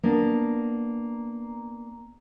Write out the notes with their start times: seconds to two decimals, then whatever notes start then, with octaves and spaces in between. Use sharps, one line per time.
0.03 A#3 B3 D4